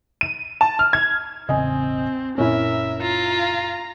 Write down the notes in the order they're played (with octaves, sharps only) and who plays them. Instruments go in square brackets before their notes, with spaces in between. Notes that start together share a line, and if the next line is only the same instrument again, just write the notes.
[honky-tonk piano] D#7
A5
F6
G#6
[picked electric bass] E1 A1 C#3 [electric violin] C4 [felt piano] D#5 G#5
[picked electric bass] F#1 A#2 C4 [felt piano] C#4 E4 [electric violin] A#4 E5
[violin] F4 [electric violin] A#5